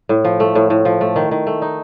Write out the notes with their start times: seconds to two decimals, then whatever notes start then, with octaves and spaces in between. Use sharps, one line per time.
0.09 A2
0.25 F3
0.40 A3
0.55 A2
0.70 A2
0.85 F3
1.01 A3
1.16 D#3
1.31 D#3
1.47 A3
1.62 D#4